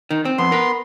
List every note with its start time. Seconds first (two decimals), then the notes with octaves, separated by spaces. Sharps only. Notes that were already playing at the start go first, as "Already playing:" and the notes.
0.11 D#3
0.25 C4
0.38 F2 B3 C6
0.52 A#4 B4